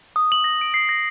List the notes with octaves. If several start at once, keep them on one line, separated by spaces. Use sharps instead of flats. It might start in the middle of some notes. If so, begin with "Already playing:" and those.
D#6
F#7
A#6
D7
C7
A#6